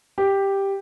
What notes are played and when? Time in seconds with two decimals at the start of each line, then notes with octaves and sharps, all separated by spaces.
0.18 G4